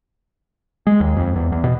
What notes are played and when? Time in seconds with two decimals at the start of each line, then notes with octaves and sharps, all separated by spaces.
0.87 G#3
1.00 D#2
1.17 F2
1.36 E2
1.52 E2
1.64 B2